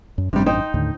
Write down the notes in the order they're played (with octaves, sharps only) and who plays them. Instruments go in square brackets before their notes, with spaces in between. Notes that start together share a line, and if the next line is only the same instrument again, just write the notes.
[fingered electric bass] F#2
[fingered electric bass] G#1 F#2 D4 [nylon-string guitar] C3 G3
[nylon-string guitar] D#4 C5 G5
[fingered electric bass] D#2 A2 D3